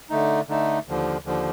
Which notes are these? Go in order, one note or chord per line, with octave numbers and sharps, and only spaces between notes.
D3 A3 D#4
D3 A3 D#4
D#2 D3 F3
D#2 D3 F3